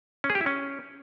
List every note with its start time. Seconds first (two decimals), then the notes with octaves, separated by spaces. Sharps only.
0.24 C#4
0.30 G#4
0.35 G4
0.41 E4
0.46 C#4